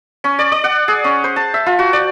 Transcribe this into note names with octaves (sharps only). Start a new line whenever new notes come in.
C#4
D5
D5
F#5
G#4
C#4
C5
A5
E5
F4
F#4
D5